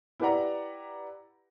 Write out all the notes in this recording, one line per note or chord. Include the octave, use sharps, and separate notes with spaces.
E4 G4 B4 D5 F#5 A#5